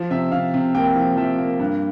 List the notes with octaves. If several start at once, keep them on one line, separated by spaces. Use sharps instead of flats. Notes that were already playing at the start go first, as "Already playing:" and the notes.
Already playing: F3
C3 E5
C3 F5
C3
A#3 G5
F3
F3 E5
A#3
G2